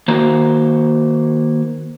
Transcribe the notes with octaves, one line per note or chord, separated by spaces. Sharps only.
D#3 A#3 F#4 C5 A#5